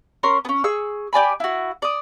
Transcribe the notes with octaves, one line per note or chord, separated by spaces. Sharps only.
C#4 A#4 C6
B3 C#4
G#4 C#6 E6
G4 D5 G#5 B5
E4 F#4
D5 D#6